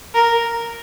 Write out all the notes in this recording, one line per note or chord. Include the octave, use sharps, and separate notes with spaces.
A#4